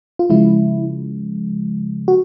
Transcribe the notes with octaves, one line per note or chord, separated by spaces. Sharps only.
F4
C#3 F3 G#3 E4
F#4